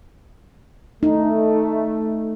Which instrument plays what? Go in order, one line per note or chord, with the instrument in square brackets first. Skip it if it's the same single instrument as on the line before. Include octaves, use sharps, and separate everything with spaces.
[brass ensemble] A3 [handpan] D#4